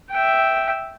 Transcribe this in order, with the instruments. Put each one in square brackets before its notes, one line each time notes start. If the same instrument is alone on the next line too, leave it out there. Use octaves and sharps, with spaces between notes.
[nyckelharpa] E5 G5